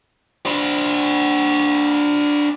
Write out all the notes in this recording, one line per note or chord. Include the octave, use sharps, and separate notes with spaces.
D4 C5